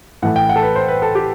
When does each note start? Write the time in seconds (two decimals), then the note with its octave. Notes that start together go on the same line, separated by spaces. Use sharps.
0.22 A2 E3 A3 F#5
0.36 G5
0.49 F#5
0.56 A4
0.63 B4
0.76 C5
0.88 B4
1.02 A4
1.15 G4